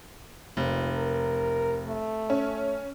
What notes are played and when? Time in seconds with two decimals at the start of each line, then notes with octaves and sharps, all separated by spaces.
0.57 F1 A#2
0.95 A#4
1.87 A3
2.30 C#4